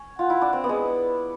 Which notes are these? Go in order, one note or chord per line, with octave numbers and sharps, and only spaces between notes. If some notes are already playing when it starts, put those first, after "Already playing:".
Already playing: C#4
F4 F#5
E4
D4
C4
B3
G#3